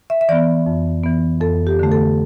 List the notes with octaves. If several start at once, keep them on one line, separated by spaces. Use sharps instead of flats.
E5
E5
E3 B3 D5
F2
E3 B3
F2 A4
G4
D3 A3
A4